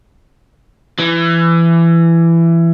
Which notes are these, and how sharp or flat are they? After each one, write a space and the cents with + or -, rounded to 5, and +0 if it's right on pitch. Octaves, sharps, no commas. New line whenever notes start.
E3 +20